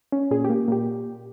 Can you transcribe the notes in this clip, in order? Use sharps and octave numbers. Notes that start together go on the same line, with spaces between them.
C#4
A#2 G#4
G4
A#3
A#2 G4